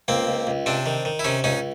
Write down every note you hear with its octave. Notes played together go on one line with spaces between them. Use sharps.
C#2 A#3 C4
C#2
C#2
C3 C4 D4
D#3
D#3
E4
C3 C#4 D#4
C#2 C#4 D#4